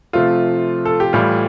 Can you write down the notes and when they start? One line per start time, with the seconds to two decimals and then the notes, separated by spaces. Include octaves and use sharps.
0.13 C3 F3 A3 F4
0.85 A4
1.00 G4
1.13 A2 E3 G3 F4